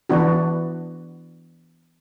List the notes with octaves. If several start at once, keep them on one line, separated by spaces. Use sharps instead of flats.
E3 B3 D4 F#4